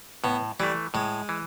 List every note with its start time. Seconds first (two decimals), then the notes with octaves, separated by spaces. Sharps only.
0.24 A2 B3
0.60 E3 G3 A3
0.94 A2 G#3
1.29 E3